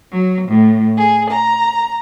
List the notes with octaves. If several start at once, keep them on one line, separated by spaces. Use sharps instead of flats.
F#3
A2
G#4
A#5